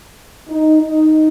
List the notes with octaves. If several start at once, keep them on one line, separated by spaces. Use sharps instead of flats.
D#4
D#4